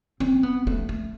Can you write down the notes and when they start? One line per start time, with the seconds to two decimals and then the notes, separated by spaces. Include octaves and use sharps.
0.20 C4
0.43 B3
0.67 A3
0.89 A3